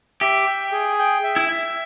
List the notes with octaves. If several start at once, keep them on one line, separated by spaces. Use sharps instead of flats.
G4 E5
G5
G#4
G5
E5
E4
E5